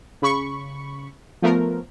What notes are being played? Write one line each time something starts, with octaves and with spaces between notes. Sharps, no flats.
C#3 B5 C#6
F3 A3 B3 A#4